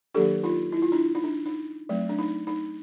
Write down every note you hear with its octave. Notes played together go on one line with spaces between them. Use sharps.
D#3 F#3 A#3 D4 G4 A4
D#4 F4
E4
F4
D4 E4
D#4
D4
D#4
F#3 A3 C4
D4
D#4
D#4